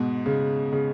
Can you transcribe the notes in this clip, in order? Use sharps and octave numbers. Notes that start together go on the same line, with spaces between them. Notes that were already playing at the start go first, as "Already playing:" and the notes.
Already playing: G#2 B2
C#3
C#3